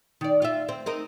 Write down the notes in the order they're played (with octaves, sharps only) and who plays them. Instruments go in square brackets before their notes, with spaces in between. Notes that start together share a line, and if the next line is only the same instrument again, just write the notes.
[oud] D#3 D5
F4 E5
C4
C4 D#4 A#4